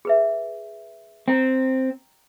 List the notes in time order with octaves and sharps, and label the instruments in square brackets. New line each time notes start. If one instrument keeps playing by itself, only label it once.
[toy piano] G#4 B4 E5
[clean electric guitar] C4 [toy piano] G5 A#5